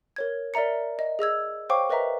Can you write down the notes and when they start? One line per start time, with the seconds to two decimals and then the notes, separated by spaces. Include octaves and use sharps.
0.16 A#4 C#5 G#6
0.54 A#4 D5 E5 A#5 C#7
0.99 D#5
1.19 G#4 D#5 E6 G#6
1.70 C5 C#5 F5 G5 C#6 D6
1.90 A#4 B4 D#5 E5 A#5